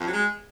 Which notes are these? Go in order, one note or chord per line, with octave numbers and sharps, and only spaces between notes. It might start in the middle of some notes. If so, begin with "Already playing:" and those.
F2
F#3
G#3